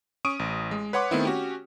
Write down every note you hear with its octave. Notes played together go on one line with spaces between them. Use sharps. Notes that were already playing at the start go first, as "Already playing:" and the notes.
C#4 C#6 D#6 D7 D#7
A1
G#3
B4 C#5 F#5 C6 D6
D#3 A3 B3 C4 E4
C#4 F#4 G4